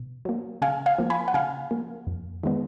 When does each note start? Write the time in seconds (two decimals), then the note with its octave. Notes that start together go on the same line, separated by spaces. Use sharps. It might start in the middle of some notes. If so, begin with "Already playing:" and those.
Already playing: B2
0.25 F#3 A#3
0.62 C#3 F5 G#5
0.86 F5 G#5
0.98 F3 A#3
1.10 G#5 B5
1.28 F#5
1.34 C#3 F5 G#5
1.71 F3 A#3
2.07 F2
2.43 D#3 G#3 B3